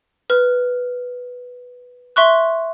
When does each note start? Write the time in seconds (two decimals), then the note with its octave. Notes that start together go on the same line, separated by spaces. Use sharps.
0.30 B4 F6
2.16 E5 C6 C#6 F#6